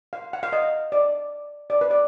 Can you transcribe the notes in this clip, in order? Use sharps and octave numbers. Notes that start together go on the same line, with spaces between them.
F5
F#5
F5
D#5
D5
D5
B4
D5